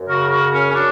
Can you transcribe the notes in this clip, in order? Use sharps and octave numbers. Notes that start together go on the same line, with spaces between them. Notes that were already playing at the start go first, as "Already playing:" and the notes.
Already playing: F#2
C#3 F#4 A#4
F#4 A#4
F#2
C#4
C#4
F#3 D4